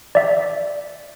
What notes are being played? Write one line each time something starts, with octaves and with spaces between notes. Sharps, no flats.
D5 E5